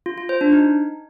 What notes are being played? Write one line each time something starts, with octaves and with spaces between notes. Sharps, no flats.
F4
F4
C5
D4
D#4